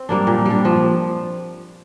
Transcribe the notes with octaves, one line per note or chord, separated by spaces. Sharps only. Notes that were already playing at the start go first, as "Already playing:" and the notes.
Already playing: C4
G3 A#3 D4
A#2
G3 D4
F3